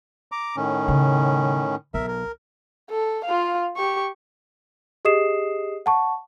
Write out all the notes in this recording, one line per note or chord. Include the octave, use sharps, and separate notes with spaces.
A#5 D6
A2 D#3 C#4
C#3 G3
B1 A#4 E5
A#4
A4
F4 F5
G4 C#6
G4 G#4 D#5 D#6 C7 E7
F#5 A5 C#6